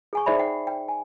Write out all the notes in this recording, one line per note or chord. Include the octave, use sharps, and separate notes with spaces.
G#4 G#5 C#6
D#4 G#4 C5 D5 E5 B5
F#5 G5
G5
G#5